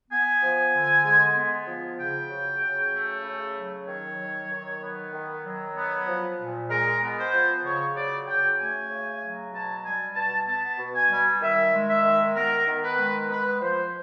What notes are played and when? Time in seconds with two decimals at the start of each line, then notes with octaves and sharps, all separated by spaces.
0.10 B3 G#5
0.42 F3
0.73 D3
1.05 G#3
1.36 B3
1.67 F3
1.99 C#3 G5
2.30 F#3
2.61 C#3
2.93 A3
3.24 C#3
3.56 F#3
3.87 D#3 C#5
4.18 F#3
4.50 D#3
4.82 B3
5.13 D#3
5.44 F#3
5.76 B3
6.07 F3
6.38 A#2
6.69 G#3 A#4
7.01 B3
7.17 C5
7.32 F3
7.64 C#3 C#5
7.95 F#3 D5
8.27 C#3 G5
8.58 A3 G#5
8.90 C#3
9.22 F#3
9.53 B2 A5
9.83 G3 G#5
10.15 B2 A5
10.47 B3 A5
10.78 B2
10.94 G#5
11.09 G3
11.41 D#3 E5
11.72 G#3
11.88 E5
12.04 D#3
12.35 B3 A#4
12.67 D#3
12.82 B4
12.98 G#3
13.30 B3 B4
13.61 F3 C5